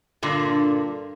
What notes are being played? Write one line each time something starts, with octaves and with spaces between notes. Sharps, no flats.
G2 A#2 D3